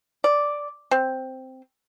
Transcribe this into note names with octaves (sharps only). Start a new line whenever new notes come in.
D5
C4